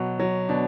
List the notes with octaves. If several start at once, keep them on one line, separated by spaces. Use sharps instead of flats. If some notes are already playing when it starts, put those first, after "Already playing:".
Already playing: B2 F#3
F#3
B2 D4